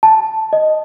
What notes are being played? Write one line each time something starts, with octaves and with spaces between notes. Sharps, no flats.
A5
D#5